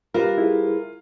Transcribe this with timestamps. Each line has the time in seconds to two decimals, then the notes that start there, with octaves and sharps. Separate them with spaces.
0.14 G3 F4 G4 A#4 B4
0.38 E4 G#4